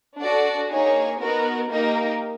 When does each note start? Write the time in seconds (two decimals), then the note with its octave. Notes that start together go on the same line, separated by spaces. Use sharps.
0.18 D4 F#4 A4 D5
0.69 A#3 D#4 G#4 C#5
1.19 B3 D#4 F#4 A#4
1.70 A#3 D#4 G4 A#4